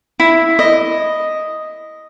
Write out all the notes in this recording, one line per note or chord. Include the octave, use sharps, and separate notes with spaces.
E4
D#5